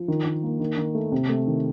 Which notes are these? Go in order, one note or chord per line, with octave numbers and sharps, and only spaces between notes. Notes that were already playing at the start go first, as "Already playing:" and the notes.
Already playing: F3
D#3
D#3
A#3
D#3
D#3
A3
C3
A3
D#3